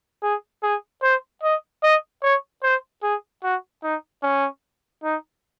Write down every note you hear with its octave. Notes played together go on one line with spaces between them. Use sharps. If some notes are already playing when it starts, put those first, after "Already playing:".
G#4
G#4
C5
D#5
D#5
C#5
C5
G#4
F#4
D#4
C#4
D#4